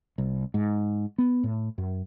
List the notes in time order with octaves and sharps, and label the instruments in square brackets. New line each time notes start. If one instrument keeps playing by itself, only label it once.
[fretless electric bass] C2
G#2
B3
A2
F#2